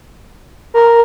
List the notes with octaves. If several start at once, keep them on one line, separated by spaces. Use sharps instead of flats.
A#4